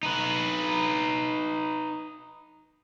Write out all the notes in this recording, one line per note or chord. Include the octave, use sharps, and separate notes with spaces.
D#4 B4